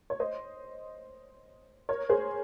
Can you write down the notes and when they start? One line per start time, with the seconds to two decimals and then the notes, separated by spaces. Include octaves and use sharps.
0.10 C#5
0.20 C5 D#5
1.89 A#4 C#5
2.09 G#4 C5